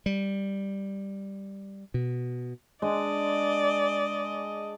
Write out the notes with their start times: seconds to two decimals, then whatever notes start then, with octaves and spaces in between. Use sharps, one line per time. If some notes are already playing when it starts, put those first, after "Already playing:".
0.06 G3
1.94 B2
2.82 G#3 D4 D5 D#5